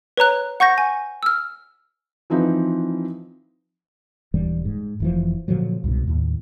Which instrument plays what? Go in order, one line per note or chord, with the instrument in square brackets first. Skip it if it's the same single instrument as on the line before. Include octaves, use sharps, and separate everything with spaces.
[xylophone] B4 C#5 A#5 F#6
F#5 C#6 G6 A#6
G#5
E6 F6
[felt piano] E3 F3 C4 D#4 B4
[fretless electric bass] D#1 G#2 E3 G3
G#2
F1 E3 F3
A#2 D3 F3 F#3
C2 G#2 B2
D#2 A2